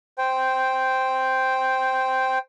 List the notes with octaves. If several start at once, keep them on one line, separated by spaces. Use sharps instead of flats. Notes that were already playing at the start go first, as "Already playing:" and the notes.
C5 G5